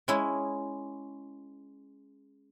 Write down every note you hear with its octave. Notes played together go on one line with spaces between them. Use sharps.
G#3 C#4 E4